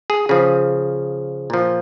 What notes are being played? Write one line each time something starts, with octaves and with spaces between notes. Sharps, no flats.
G#4
C#3 F3 G#4
A#2 F3